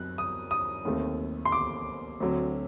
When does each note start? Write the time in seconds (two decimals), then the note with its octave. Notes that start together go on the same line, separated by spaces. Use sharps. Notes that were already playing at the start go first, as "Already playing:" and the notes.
Already playing: F#2 C4 F#6
0.18 D#6
0.51 D#6
0.85 D#2 D#3 A3 C4
1.45 C6
1.52 D6
2.20 D2 D3 F#3 C4